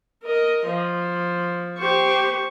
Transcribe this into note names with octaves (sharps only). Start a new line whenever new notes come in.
A#4 D#5
F3
G4 C5 C#6